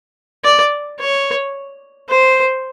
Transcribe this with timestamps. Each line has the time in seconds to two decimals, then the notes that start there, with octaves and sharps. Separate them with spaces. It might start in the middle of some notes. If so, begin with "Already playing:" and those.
0.44 D5
1.00 C#5
2.09 C5